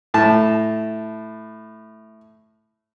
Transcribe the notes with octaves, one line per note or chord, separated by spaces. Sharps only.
A2 A5